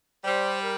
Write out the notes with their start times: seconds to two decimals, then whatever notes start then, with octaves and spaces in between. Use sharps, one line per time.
0.24 G3 C5
0.61 A#4